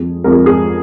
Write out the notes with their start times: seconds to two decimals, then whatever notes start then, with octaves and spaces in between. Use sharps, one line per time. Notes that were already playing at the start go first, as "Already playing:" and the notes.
Already playing: F2 G#4
0.24 F2 A#4
0.31 G#4
0.46 G#4